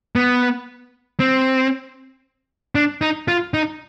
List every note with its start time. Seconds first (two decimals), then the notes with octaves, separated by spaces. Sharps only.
0.16 B3
1.20 C4
2.75 D4
3.01 D#4
3.28 F4
3.54 D#4